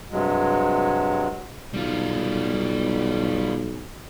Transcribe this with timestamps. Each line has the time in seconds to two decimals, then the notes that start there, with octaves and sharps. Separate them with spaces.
0.12 G2 C3 F#3 G#3
1.74 B1 G3 F4